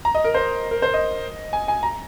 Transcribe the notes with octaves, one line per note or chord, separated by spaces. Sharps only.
A#5
D#5
A#4
C5
A#4
C5
D#5
G#5
G#5
A#5